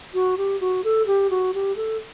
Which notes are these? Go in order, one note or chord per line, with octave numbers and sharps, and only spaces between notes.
F#4
G4
F#4
A4
G4
F#4
G4
A4